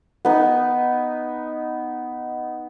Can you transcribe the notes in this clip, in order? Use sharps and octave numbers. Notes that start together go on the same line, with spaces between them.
B3 D#4